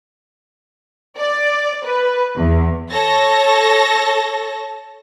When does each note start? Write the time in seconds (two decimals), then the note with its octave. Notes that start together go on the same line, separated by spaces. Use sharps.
1.18 D5
1.86 B4
2.36 E2
2.90 A4 C#5 A5 A#6